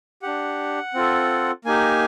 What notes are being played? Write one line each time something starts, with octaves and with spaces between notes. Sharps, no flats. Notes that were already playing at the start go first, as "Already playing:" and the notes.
D4 G4 F#5
C4 F4 A4
A#3 D#4 G4 G#5